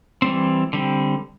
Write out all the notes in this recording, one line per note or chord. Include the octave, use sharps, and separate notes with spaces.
E3 G3 C4
D3 G3 C4